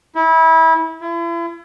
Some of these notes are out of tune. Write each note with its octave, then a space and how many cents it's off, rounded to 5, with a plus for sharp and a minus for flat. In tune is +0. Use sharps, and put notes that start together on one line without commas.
E4 -25
E4 +40